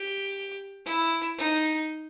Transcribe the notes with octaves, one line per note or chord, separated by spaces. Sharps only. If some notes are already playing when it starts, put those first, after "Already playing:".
Already playing: G4
E4
D#4